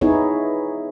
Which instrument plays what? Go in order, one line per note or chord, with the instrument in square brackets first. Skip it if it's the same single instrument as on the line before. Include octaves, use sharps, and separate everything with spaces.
[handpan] B3 D#4 E4 G#4 C#5